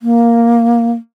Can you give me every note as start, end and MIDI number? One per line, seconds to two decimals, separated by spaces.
0.01 0.92 58